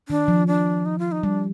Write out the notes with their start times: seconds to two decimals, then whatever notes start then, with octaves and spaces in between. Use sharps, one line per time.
0.09 D#3 D4
0.28 F3
0.47 D4
0.85 D#4
0.99 F4
1.12 D#4
1.23 G3 D4